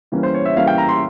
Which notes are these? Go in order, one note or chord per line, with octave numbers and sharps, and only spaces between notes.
E3 G3 A#3 C#4
C5
C#5
E5
E3 G3 A#3 C#4 F5
G5
A#5
C6